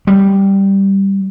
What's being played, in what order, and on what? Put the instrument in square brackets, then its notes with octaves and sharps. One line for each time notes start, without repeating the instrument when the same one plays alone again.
[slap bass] G3